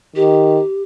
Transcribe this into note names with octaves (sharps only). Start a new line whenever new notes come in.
D#3 G4